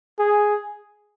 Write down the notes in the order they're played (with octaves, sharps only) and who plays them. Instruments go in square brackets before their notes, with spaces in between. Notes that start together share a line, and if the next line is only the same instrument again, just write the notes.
[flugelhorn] G#4